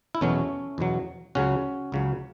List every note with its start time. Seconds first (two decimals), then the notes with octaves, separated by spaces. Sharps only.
0.15 E4
0.21 E2 B2 F#3 A3 C#4
0.78 E2 B2 F#3
1.35 C#2 C#3 F#3 C#4 F#4
1.92 C#2 C#3 F#3